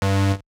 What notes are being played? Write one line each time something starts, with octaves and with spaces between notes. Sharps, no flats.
G2